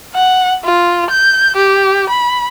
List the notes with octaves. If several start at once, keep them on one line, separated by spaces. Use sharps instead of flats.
F#5
F4
G6
G4
B5